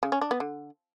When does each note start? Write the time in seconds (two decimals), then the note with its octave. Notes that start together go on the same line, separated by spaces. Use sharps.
0.03 C#3
0.12 C#4
0.21 D4
0.31 B3
0.40 D3